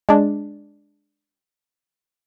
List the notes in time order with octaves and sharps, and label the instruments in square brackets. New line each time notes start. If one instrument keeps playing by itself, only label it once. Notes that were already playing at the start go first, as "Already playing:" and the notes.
[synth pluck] G#3 D4